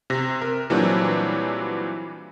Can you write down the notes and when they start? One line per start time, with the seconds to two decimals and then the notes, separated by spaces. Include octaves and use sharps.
0.10 C3 A#6
0.42 A#4
0.70 A#2 E3 F#3 G3 C4 D4